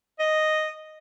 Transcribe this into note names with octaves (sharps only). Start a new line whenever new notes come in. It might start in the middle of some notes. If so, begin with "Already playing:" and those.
D#5